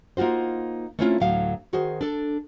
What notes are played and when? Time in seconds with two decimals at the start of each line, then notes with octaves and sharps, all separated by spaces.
0.17 A#3 D#4 F4 F#4 C5
0.99 A3 A#3 C4 C#4 E4 F4
1.20 D2 A2 F#3 F5
1.73 D#3 F#4 G#4 C5
2.01 D4 A4